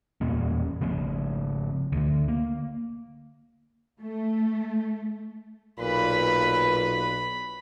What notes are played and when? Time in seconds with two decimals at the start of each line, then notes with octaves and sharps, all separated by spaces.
0.21 E2 A#2 A#3 C#4
0.81 C#3 F3 C4
1.92 D2 D3
2.28 A#3
4.01 A3
5.79 B1 A#2 B4 B5